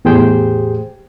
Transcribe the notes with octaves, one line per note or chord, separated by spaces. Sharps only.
E2 A2 G4 G#4 C5 G5